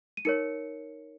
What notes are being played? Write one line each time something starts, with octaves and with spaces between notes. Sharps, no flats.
D#7
D#4 A#4 C#5 C#7